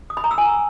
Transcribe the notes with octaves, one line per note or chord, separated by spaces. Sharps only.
D#6
B5
A#5
E6
G#5